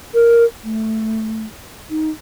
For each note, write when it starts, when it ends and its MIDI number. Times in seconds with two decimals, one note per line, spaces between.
0.14 0.44 70
0.64 1.44 57
1.90 2.09 63